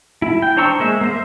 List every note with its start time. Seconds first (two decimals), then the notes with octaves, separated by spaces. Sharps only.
0.22 E4
0.42 G5
0.57 D4 C5 A#5 C#6 E6
0.79 G#3 A#3 E5
1.01 A#3 C5 E5